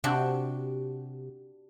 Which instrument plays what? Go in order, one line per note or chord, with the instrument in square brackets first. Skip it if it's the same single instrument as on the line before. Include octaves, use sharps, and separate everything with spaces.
[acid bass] C3 [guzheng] D4 F#4 G4